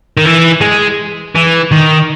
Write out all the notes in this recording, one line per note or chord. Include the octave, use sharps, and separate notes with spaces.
D#3
E3
G#3
E3
D#3